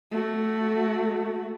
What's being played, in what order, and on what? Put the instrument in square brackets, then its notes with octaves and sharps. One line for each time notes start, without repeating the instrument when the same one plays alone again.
[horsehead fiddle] A3 F#4